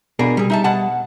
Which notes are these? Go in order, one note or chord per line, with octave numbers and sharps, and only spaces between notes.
B2 D4 G#4 A#4
C3 G3 G#4
D#4 E5 A5
B2 F#5 A5